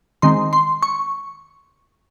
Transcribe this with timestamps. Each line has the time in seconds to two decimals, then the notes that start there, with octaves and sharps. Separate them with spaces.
0.22 D#3 G#3 C4 C6
0.53 C6
0.82 C#6